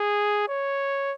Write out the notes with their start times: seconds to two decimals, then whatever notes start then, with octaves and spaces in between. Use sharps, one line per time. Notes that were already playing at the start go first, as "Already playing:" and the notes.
Already playing: G#4
0.49 C#5